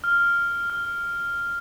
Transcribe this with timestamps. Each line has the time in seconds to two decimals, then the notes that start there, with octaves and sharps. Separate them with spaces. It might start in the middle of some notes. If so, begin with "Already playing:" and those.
0.04 F6
0.70 F6